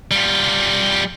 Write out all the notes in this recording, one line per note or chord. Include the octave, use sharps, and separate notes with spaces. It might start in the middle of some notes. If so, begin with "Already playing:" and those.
G3 F4